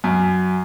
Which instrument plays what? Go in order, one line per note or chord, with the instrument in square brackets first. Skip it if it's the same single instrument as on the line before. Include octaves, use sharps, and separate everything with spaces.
[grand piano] F#2